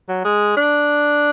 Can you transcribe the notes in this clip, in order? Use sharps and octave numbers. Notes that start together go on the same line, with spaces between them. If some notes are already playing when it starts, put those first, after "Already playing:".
F#3
G#3
D4